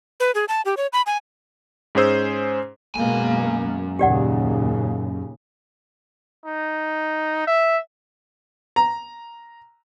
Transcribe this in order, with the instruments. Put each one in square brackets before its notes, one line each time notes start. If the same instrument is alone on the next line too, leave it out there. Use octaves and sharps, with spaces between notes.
[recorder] B4
G#4
A5
G4
C#5
B5
G#5
[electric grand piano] G#2 C#4 G#4 C5 E6
[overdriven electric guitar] F#2 G#5 [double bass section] B2 G#3 A#3
[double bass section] D#2 A#2 C#3 [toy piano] G4 D5 F#5
[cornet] D#4
E5
[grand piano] A#5